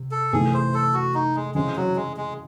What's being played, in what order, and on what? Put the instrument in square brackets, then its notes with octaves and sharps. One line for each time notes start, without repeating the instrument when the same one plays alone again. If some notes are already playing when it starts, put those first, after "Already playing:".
Already playing: [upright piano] C3
[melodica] A4
[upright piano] C3 E3 A3 [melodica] G#4
[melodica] C5
A4
F#4
D#4
G#3
[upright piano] C#3 E3 C4 E4 [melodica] G#3
[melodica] F#3
G#3
G#3